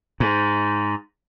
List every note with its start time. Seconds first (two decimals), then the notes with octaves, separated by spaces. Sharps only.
0.20 G#2